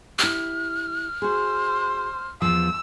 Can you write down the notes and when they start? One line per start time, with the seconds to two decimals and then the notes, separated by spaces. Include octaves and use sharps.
0.19 E4 G4 F6
1.22 F#4 G#4 C5
2.42 E2 F3 E6